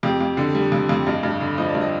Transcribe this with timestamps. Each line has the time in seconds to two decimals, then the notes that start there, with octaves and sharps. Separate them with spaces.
0.03 F2 G4
0.21 F2
0.37 D3
0.55 G3
0.72 F2
0.89 F2
1.07 G2 D#5
1.23 G2
1.40 D3
1.58 F3 D#5
1.69 D5
1.75 G2
1.81 D#5